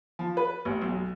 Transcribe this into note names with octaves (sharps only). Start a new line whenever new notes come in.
F3
B4
A1
B1